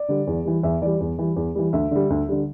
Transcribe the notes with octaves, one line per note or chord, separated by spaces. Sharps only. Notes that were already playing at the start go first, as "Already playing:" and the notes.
Already playing: D5
D3 G3
E2
E3 G3
E2 E5
E3 G3 D5
E2
E3 G3
E2
E3 G3
D2 E5
D3 G3
D2
D3 G3